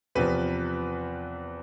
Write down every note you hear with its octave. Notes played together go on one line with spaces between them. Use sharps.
E2 C3 F3 B4